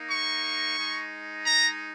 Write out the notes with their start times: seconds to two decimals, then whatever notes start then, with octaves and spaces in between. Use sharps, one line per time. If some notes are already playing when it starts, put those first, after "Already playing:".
Already playing: A#3 D#4
0.09 C#6
0.78 G#3 D#4
1.46 A#5